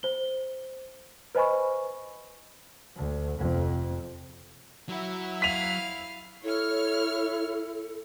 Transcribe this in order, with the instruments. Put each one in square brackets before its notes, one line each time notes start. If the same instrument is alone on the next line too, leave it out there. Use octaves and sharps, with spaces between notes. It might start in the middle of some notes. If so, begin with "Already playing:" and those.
[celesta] C5 G7
B4 C5 D#5 G#5 B5 C#6
[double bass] D2
F1 F2
[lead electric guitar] F#3 F#4 [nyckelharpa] E4 E5
[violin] F5 [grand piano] B6 D#7 F7
[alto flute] E4 [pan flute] A4 [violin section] C#5 F6